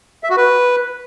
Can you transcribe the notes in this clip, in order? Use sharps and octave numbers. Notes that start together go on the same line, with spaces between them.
E5
F#4
B4